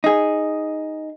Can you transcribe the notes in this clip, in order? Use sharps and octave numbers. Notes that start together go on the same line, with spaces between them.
D#4 G#4